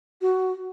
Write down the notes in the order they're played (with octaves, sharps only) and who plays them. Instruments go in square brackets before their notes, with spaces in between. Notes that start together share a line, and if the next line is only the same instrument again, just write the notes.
[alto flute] F#4